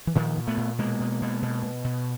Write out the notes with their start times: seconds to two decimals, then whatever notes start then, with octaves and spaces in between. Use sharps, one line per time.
0.07 E3
0.15 A#2 D#3 F3
0.37 A#2
0.47 A3 B3
0.57 A#2
0.78 B2 G#3 A#3
1.00 B2
1.22 B2
1.42 B2
1.63 B2
1.84 B2